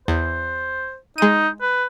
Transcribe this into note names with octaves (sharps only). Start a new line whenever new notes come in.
E2 C5
G#3 D#4 D#7
B4